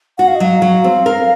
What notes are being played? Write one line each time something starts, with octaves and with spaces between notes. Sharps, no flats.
F#4 F#5
F5
D#5
F#3 F5
F#3
C4
A#4